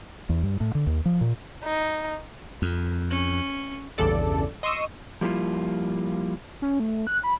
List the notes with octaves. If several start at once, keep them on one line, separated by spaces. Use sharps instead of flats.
E2
G2
A2
D3
D#2
F3
A#2
D#4
F2
C#4
A#1 E2 G2 C#3 A4 D5
D#5 C6 C#6 D#6 E6
F3 G3 A#3 E4 F4
C#4
A3
F#6
B5